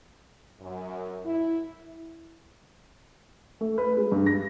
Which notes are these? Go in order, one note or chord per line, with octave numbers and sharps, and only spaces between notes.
F#2
E4
A3
B4
G#3
G2
A#6